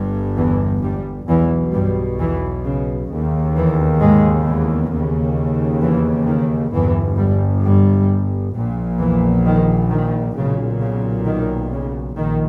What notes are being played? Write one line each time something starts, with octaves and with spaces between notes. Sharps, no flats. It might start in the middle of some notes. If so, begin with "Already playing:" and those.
Already playing: G1 G2
E2 E3
G2 G3
B1 E2 B2 E3
G2 G3
E2 E3
C#3
D#2 C#3
E2 E3
G#2 G#3
E2 E3
D#2 C#3
E2 E3
D#3
G1 E2 G2 E3
G2 G3
G2 G3
A#1 A#2
E2 E3
D#3
D#3
B1 A#2 C#3
C#3
D#3
C#3
A#1 D#3